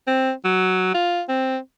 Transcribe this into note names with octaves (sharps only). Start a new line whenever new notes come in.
C4
F#3
F4
C4